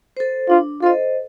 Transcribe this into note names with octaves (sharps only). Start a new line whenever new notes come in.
A4 C5
D4 F4
F4 A4 C5 D#5